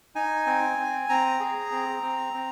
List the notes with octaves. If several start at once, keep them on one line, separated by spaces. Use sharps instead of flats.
D#4 G#5
C4
C4
C4 A#5
G#4
C4
C4
C4